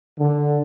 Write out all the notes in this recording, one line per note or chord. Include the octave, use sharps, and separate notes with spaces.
D3